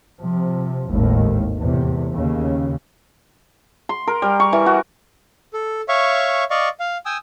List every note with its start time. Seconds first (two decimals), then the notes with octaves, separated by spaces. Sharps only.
0.21 C3 F3
0.89 G#1 D#2 A2 D#3
1.57 E2 A2 C3
2.13 D#2 C#3
3.89 C6
4.07 A#4
4.22 G3
4.40 C#6
4.53 E3
4.66 F#4
5.53 A4
5.88 C#5 E5 F5 C#6
6.51 D5 D#5 F5 C#6
6.80 F5
7.06 G5 G#5 D#6 E6